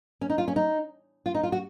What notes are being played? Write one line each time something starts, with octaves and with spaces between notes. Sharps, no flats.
C#4
D#4
F4
C#4
D#4
F4
D#4
F4
F#4